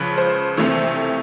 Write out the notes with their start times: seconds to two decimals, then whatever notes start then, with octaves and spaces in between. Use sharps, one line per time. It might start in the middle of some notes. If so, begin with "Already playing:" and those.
Already playing: C#2 C#3 F3 B4
0.18 C5
0.57 C2 C3 E3 A3